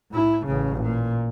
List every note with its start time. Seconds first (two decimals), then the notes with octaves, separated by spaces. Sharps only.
0.12 A2 E4
0.46 A1 C#3
0.82 A#2